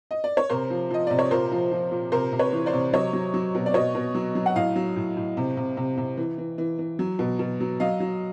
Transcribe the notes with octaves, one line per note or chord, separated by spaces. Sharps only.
D#5
D5
C#5
C3 A#4 C5
F3
F3 D#5
C3 D5
C#5
A#2 A#4 C5
F3
F3
A#2
C3 A#4 C5
C3
B4 C#5
E3
C5 D5
C3
F#3 C#5 D#5
F#3
F#3
B2
D5
B2 C#5 D#5
B2
F#3
F#3
F#5
A2 D#5 F5
F#3
A2
A2
C3
C3
C3
C3
E3
E3
E3
E3
F#3
B2
B2
F#3
F#3 D#5 F5
F#3